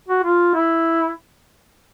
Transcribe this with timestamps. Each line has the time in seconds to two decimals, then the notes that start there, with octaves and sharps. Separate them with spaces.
0.09 F#4
0.23 F4
0.55 E4